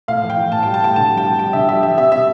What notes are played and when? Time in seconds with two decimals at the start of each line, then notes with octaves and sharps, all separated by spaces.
0.08 A2 F5
0.23 E3
0.30 G5
0.37 E3
0.52 A2 A5
0.63 G3 G5
0.74 A5
0.80 A2 G5
0.96 D3 A5
1.10 G3
1.17 G5
1.24 G3
1.39 G3 G5
1.53 D3 E5
1.68 G3 E5
1.83 G3 E5
1.97 C3 E5
2.12 C3 E5